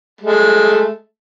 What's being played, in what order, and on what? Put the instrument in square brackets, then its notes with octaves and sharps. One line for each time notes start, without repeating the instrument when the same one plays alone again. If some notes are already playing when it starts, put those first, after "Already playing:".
[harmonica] G#3 A3